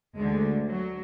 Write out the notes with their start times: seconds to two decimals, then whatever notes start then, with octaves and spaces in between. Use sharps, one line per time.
0.16 D2 D3 G#3
0.69 F#3